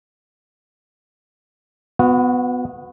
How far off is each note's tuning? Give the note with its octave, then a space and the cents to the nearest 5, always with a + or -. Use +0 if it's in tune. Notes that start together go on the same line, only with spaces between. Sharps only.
B3 +15 F#4 -30